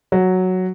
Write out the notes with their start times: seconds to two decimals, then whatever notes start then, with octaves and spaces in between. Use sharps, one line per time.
0.12 F#3